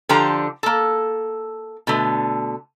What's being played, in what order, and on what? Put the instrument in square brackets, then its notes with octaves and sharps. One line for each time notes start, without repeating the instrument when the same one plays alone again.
[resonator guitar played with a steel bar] D3 F3 D4 G4 C5 A#5
A#3 A4
B2 D3 A3